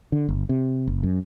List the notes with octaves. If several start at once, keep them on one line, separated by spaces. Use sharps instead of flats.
D3
G1
C3
F#1
F#2